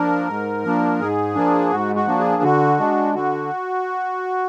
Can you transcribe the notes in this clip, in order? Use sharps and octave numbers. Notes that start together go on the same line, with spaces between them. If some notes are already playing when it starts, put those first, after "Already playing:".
Already playing: F3 A#3 D4 A#4
G#2
F3 A#3 D4
G#2 G#4
F3 A#3 D4
G#2 F#4
F#4
F3 A#3 D4
G#4
D3 F#4
G#3 D4
D3 F#4